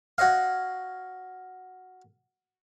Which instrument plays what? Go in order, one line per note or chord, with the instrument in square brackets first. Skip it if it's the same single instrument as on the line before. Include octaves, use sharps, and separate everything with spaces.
[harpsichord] F#4 C#5 D#5 F5